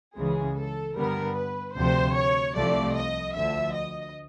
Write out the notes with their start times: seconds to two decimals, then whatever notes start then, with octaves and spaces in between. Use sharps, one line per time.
0.16 C#2 C#3 E3 G#3 G#4
0.56 A4
0.95 G2 D3 G3 B3 A#4
1.36 B4
1.75 D2 C3 F3 C5
2.16 C#5
2.55 C2 C3 F3 A3 D5
2.96 D#5
3.35 D2 D3 F3 E5
3.75 D#5